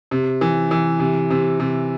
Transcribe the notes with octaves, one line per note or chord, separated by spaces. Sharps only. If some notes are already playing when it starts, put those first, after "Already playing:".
C3
E3
E3
C3
C3
C3